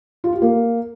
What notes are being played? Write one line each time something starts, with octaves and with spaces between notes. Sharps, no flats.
F4
G4
A#3